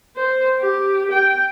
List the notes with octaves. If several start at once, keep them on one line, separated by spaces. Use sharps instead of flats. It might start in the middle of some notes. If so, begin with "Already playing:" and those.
C5
G4
G5